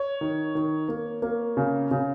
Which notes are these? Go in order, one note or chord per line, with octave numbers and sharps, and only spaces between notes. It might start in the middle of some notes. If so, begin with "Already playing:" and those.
Already playing: C#5
D#3
D#3
A#3
A#3
C#3
C#3